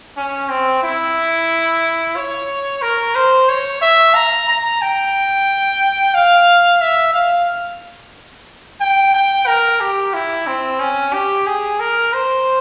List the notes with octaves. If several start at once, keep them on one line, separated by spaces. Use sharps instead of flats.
C#4
C4
E4
C#5
A#4
C5
C#5
E5
A#5
A#5
G5
F5
E5
F5
G5
G5
A#4
G4
E4
C4
C#4
G4
G#4
A#4
C5